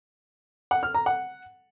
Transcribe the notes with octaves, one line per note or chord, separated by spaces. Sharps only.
F#5
F6
A#5
F#5